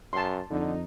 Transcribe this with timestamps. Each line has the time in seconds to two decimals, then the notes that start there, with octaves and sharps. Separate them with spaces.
0.13 F#2 A5 C6
0.51 F2 D3 D#4